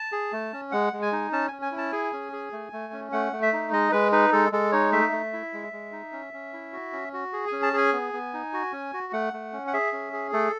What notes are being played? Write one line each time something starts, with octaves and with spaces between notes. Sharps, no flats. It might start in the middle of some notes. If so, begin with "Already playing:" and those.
Already playing: A5
G#4
A3
C#4
G#3 F#5
G#3
G#5
D#4
C#4 A5
C#4 G#5
G#5
E4
A5
G#4 G#5
C#4
G#4
A3
A3
C#4
A3 F#5
A3
E5
D#4
G#3 D#5
G#3 B4
D#4 B4
G#3 A4
G#3 A4
D#4 C#5
A3 E5
A3
E4
G#3
G#3
D#4
C#4
C#4
E4
F#4
C#4
F#4
G#4
C#4 G#5
A5
G#4 G#5
B3
B3
D#4
F#4
C#4
F#4
A3 F#5
A3
C#4
F#5
G#4 E5
C#4
G#4
A3 A4